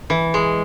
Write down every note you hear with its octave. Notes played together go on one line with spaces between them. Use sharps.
E3
G#3